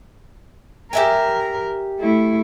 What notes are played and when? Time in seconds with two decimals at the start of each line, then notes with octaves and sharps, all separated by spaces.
0.93 G4 A#4 E5 G#5
2.00 A3 E4